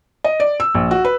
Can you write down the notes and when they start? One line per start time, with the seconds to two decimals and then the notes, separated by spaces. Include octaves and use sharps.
0.24 D#5
0.40 D5
0.60 E6
0.75 A#1
0.91 F#4
1.05 B4